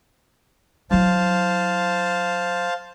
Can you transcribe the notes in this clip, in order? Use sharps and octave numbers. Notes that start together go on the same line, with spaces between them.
F#3 E4 C5 F5 A5